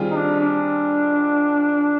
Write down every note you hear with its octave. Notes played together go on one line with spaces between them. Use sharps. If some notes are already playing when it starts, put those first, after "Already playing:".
Already playing: D#3 G3 C4 F4 G#4
D#4
D4
D4